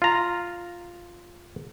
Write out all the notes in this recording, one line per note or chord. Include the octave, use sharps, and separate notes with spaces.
F4 A#5